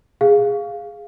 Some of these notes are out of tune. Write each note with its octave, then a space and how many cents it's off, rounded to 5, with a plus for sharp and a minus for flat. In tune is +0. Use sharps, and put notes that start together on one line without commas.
G#4 -10 F5 +0